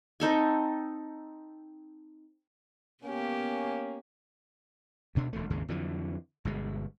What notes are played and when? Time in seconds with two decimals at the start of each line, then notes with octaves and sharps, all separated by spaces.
0.20 C4 D#4 A4 G#5
3.03 A#3 B3 C#4 G4
5.15 D2 B2 D4
5.33 E1 D2 A3
5.50 G#1 D#2 C#3 G#3
5.68 F2 D3 E3 F#3
6.45 G1 B2 G#3